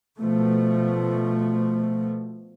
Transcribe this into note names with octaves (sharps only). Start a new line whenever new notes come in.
B2 F3 A3